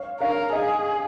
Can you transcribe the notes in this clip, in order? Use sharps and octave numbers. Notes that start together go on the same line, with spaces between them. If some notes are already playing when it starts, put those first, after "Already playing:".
Already playing: C#5 F5
A#4 C#5 F5
G#4 D#5